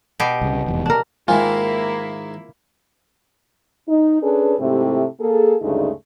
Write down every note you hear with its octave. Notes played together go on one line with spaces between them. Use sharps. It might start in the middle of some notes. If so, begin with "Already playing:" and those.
B2 G4
C2 C#3
F1 E2 G#2
D4 A#4
G#2 D#3 G#3 A#3 E4 F4 G#5
D#4
C#4 D4 G#4 A4 B4
G#2 C3 A3 C4 E4 G4
A#3 G#4 A4
D2 G2 C#3 G#3 A3 D#4